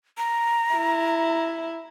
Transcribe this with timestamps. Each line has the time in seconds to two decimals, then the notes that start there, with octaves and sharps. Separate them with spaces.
0.18 A#5
0.75 E4